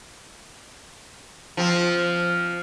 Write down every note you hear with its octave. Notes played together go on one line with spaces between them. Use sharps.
F3 C4